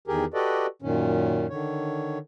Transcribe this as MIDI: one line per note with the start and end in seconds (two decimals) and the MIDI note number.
0.08 0.25 40
0.08 0.25 51
0.08 0.25 67
0.08 0.25 68
0.08 0.25 70
0.34 0.66 66
0.34 0.66 67
0.34 0.66 69
0.34 0.66 71
0.34 0.66 74
0.34 0.66 75
0.82 1.47 42
0.82 1.47 46
0.82 1.47 51
0.82 1.47 61
1.50 2.18 50
1.50 2.18 51
1.50 2.18 73